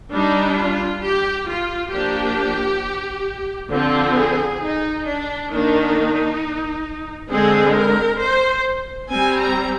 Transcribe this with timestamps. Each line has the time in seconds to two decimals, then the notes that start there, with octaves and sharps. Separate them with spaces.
0.13 G3 D4 D#4
0.58 F4
1.03 G4
1.48 F4
1.92 F3 A#3 D4 G4
3.71 D3 F3 C4 F4
4.16 G#4
4.61 D#4
5.05 D4
5.51 D#3 A#3 D4 D#4
7.30 D3 G#3 C4 G#4
7.75 A#4
8.19 C5
9.09 G3 C4 G#5
9.39 A#5